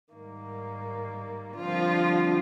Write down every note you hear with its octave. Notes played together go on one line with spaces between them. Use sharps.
G#2 D#3 G3 A#3
D3 F3 G3 C4 F4